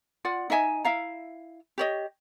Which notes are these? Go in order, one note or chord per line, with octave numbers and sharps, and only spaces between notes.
F4 D5 F#5
D#4 D#5 E5 G#5
E4 E5 F5 A#5
G4 C#5 D#5